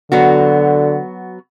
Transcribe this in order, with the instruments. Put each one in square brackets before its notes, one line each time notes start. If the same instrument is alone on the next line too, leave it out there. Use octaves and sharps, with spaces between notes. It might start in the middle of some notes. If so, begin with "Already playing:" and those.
[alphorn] D3 [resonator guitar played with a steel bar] F#3 B3 F#4